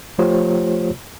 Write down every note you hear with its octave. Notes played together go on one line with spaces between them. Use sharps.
F3 A3 F4 G4 C5 C#5